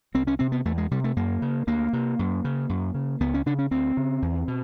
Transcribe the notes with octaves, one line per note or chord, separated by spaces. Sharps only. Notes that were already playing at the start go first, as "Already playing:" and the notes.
C2 C4
C#4
C3 C4
B3
E2 A3
G#3
C3 G3
A3
F#2 A#3
C#3
D2 A#3
C3
F#2
C#3
F#2
C#3
C#2 B3
C#4
C#3 D4
C#4
D2 C4
C#3
E2
B2